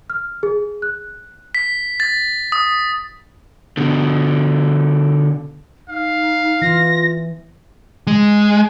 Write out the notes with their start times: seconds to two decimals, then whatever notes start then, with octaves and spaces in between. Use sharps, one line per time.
0.10 F6
0.43 G#4
0.82 F#6
1.55 B6
2.00 A6
2.52 D#6
3.77 B2 D3
5.89 D#4 F5
6.62 E3 F4 A#6
8.07 G#3